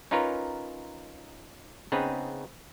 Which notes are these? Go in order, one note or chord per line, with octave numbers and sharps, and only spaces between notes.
C#4 D#4 F4 A#4 B4 C#5
C#3 B3 C4 D#4 G#4 B4